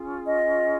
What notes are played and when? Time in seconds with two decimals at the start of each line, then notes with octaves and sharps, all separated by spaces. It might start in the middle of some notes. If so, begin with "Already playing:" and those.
Already playing: C#4 F4 G#4
0.25 D#5